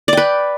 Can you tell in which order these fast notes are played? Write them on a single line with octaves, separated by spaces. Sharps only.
D5 G5 B4